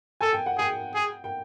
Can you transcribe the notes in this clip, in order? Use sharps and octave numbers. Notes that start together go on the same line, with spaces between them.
A4 G#5
G5
F#5
G#4 G5
G#4
G5